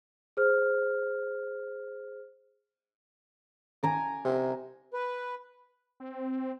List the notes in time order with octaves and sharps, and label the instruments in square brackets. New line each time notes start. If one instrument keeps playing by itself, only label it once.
[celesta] G#4 C5 F6
[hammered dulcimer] G#5 A#5 D6
[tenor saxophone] C3
[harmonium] B4
[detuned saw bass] C4